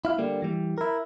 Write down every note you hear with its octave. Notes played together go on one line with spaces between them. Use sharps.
E4 F5
D3 G3 A#3
E3 G3
E4 A#4